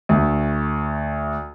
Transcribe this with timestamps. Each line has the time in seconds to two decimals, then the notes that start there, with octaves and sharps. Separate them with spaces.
0.09 D2